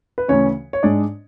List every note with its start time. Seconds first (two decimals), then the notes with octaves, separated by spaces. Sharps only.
0.18 B4
0.28 D2 C#3 E3 C#4 C#5
0.73 C#5
0.83 G#2 G#3 D4 D5